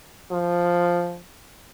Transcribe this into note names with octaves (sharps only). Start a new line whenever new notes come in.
F3